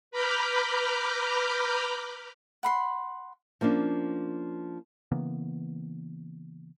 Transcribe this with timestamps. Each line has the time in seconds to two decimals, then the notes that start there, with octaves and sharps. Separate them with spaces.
0.11 B4 A#5 B5 D6 F6 G6
2.63 F#5 B5 C6
3.61 F3 A#3 C#4 D4
5.12 C#3 E3 A#3 B3